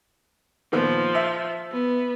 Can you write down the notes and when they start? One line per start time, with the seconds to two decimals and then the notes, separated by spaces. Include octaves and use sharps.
0.73 A#2 D#3 F3 B3
1.15 E5
1.72 B3